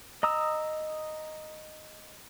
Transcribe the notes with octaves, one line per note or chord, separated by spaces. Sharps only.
D#5 A#5 D#6 E6